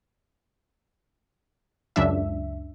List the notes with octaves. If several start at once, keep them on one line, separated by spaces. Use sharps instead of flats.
C#2 F#2 D4 E5